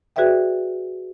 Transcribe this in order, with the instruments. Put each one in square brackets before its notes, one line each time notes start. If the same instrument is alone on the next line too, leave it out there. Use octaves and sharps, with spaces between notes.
[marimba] F#4 G#4 B4 D5 E5 G5